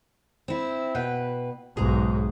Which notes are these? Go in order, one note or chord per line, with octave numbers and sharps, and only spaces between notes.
C4 E4
B2 B4 G5
B1 G#2 G#4 A#5